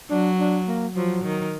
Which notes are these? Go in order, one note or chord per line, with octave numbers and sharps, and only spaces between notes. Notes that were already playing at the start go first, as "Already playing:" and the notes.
F#3 D4
D4
A#3
F3 F#3
D#3